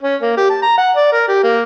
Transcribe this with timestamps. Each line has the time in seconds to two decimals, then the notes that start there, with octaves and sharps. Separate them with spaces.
0.02 C#4
0.22 A#3
0.37 G4
0.50 A5
0.62 A#5
0.78 F#5
0.96 D5
1.12 A#4
1.28 G4
1.43 A#3